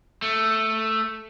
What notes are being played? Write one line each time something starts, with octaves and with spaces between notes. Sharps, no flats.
A3